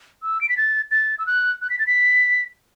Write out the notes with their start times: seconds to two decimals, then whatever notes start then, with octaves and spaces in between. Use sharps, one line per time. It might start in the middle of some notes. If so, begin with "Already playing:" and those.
0.22 E6
0.41 D7
0.49 B6
0.57 A6
0.91 A6
1.19 E6
1.27 F#6
1.62 F#6
1.70 B6
1.79 A6
1.87 B6